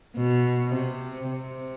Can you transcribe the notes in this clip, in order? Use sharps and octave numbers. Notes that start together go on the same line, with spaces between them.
B2
C3
C3